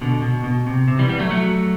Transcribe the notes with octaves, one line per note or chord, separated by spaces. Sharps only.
B2 D3
B2
B2
C3
C3
E3 G3
G3 B3
F#3 A3
F#3 A3